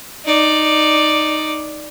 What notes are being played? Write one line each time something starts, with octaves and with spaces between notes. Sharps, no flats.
D#4 D5